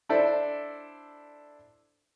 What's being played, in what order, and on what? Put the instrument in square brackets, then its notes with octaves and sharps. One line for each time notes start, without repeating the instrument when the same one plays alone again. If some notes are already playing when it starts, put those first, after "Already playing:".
[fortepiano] D4 E4 A4 C5 D5 E5